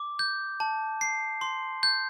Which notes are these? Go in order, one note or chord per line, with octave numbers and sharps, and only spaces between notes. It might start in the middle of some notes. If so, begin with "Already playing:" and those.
Already playing: D6
G6
A5
C7
C6
G6